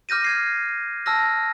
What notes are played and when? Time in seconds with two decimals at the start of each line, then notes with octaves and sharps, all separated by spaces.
0.09 D6 F6 G6 A#6 D#7
0.24 F6 G#6 C7
1.06 A5 E6 F6 A#6